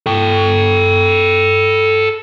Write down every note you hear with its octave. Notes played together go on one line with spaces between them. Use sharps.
A4 G5